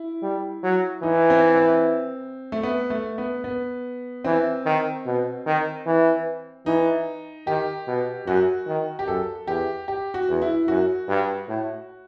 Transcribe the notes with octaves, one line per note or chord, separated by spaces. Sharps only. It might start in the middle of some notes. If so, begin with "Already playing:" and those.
Already playing: E4
G3
F#3
E3 D#4
C4
C4
A3
B3
A3
B3
B3
E3 C4
D#3
B2
D#3
E3
E3 D#4
D#3 G4
B2
F#2 F#4
D#3
G4
F#2 A4
E2 G4
G4
F#4
E2
E4
F#2 F#4
G2
A2